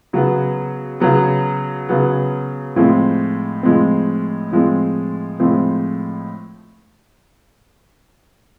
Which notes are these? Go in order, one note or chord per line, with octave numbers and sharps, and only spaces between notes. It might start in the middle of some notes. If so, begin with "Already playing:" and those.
C#3 F#3 B3
C#3 F#3 B3
C#3 F#3 B3
A2 F3 G#3 C4
A2 F3 G#3 C4
A2 F3 G#3 C4
A2 F3 G#3 C4